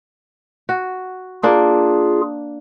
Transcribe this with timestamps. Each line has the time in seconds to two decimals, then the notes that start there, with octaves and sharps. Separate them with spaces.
0.69 F#4
1.43 A#3 D4 F4 G#4